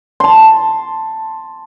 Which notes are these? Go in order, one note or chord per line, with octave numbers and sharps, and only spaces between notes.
A5 C6